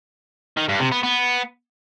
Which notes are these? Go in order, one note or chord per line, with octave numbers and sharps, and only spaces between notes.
D#3
G2
C3
B3
B3